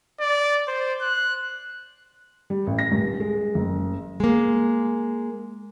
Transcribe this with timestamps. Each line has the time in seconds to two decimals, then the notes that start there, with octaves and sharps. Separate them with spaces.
0.20 D5
0.68 C5
1.01 F#6
2.50 G3
2.67 A1
2.79 A#6
2.92 D#1
3.20 G#3
3.55 F#1
4.20 G#3 A#3